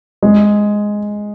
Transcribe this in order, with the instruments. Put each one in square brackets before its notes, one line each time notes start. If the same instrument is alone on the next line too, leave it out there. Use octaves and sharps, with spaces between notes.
[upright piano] G#3